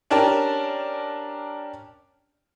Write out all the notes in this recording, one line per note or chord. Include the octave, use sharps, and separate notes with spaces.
C#4 D4 G4 A#4 A5